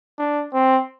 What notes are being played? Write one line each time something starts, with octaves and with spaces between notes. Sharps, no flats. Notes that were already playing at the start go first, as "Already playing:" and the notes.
D4
C4